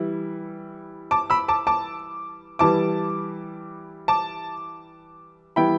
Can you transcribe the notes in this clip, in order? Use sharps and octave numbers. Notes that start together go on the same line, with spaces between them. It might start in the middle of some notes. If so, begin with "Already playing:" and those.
Already playing: E3 G3 E4
A5 D6
B5 E6
A5 D6
A5 D6
E3 G3 E4 A5 D6
A5 D6
E3 G3 B3 E4 G5 B5